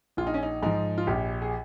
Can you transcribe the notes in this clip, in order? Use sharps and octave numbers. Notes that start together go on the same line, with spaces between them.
A#1 F4
D#4
C#4
D#4
G#2 F3 D#4
F4
A#1 G4
G#4